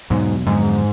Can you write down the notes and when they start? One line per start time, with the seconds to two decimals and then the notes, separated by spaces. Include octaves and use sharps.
0.10 E2 G#2 B2 F#3
0.47 F2 G#2 D3 F#3 B3